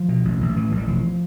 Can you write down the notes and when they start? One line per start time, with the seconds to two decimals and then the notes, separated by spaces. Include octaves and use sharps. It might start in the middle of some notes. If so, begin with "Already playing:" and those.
Already playing: F3
0.09 B2
0.25 A1
0.41 A1
0.56 A2 E3
0.72 A1
0.77 G3
0.87 E1 F3